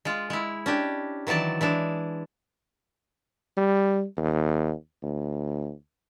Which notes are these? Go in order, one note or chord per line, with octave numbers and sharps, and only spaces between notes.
G#3 F4
G#3 E4
C#4 D4 G4
D#3 E3 F#3 D5 A5
E3 G#3 D4
G3
D#2
D2